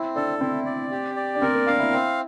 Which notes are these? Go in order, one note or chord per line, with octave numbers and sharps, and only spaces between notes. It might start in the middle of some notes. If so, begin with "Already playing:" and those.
Already playing: C4 E4
D4 A4
C4 E4
D5
G4
D5
D4
C4 A#4
A#3
D4 F5
E4
C4